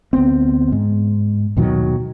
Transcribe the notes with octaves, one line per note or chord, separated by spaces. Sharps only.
D2 B3 C4
G#2
D#2 B2 D#3 F#3